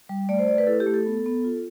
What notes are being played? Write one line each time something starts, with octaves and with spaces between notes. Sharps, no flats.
G3
A3 D5
C5
A3 D5
B4
E4 A4
G4
A3
A4
B3
B3
F4